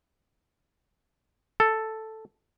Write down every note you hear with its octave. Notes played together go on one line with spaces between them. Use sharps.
A4